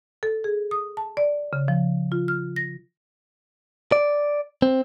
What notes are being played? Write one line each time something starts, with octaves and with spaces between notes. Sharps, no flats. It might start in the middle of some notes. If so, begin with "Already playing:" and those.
A4
G#4
D#6
A5
D5
C#3
F3
F4
F6
A#6
D5
C4